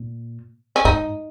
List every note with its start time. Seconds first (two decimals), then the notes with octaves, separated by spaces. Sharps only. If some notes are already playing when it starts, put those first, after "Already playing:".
Already playing: A#2
0.76 C#4
0.85 G#2 D#4